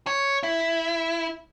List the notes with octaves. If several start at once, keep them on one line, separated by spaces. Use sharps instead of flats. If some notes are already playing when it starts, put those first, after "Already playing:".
C#5
E4